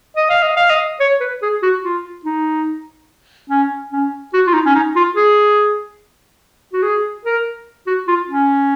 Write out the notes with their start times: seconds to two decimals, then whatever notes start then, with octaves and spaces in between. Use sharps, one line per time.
0.17 D#5
0.30 F5
0.43 D#5
0.57 F5
0.70 D#5
1.00 C#5
1.20 B4
1.42 G#4
1.63 F#4
1.84 F4
2.25 D#4
3.50 C#4
3.92 C#4
4.34 F#4
4.47 F4
4.54 D#4
4.66 C#4
4.75 D#4
4.96 F4
5.16 G#4
6.73 F#4
6.83 G#4
7.25 A#4
7.87 F#4
8.08 F4
8.29 C#4